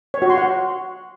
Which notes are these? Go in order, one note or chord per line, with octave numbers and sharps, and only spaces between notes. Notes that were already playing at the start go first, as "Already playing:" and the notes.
C#5
F#4
C6
F#5